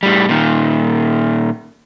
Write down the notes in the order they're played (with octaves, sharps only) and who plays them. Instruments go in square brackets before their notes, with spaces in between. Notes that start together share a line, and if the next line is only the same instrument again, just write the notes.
[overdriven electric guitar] A2 G3
A#2 D#3